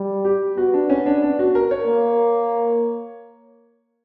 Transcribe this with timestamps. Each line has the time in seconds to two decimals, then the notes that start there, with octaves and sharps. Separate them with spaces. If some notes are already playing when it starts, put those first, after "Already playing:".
Already playing: G3
0.25 G4
0.57 B3 F#4
0.74 D4
0.90 C#4
1.06 D4
1.22 D4
1.39 F#4
1.55 A#4
1.71 C#5
1.87 A#3